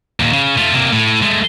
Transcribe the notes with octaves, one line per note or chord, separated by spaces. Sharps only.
D#2 A#2
C#3
A3 F4
C3 A#3
A2
G#3 A3